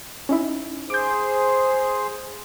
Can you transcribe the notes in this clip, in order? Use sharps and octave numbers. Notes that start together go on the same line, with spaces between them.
C#4 D#4 E4
G#4 C5 D6 G6